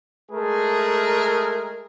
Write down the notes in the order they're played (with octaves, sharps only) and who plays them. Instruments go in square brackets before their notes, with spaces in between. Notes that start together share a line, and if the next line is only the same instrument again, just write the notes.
[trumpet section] G#3 A3 G#4 A#4